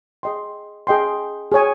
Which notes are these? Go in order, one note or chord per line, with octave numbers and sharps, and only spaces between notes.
G#4 D#5 G5 C6
G#4 D#5 G5 C6
G#4 C#5 G#5